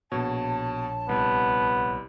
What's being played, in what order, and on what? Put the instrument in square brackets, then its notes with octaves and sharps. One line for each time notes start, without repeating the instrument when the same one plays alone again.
[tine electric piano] A#1 C#5 [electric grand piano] B2 [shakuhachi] A5
[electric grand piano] C2 [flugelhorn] B3